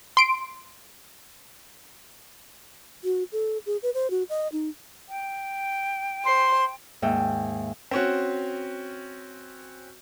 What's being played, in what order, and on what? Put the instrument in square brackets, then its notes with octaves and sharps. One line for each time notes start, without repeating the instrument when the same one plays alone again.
[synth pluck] C6 D7
[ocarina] F#4
A4
G#4
B4
C5
F#4
D#5
D#4
[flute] G5
[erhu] C5 [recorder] C6
[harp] D#2 G#2 E5 G5
[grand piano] C4 C#4 F#4